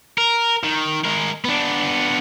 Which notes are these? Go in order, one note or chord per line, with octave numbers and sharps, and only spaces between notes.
A#4
D#3
G#3 A#4
B3 D4